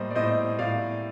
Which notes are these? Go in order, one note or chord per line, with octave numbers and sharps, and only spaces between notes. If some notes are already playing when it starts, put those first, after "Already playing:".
Already playing: A2 G3 A#3 C5 D#5
D5
A2 C5 D#5
A2 D5 F5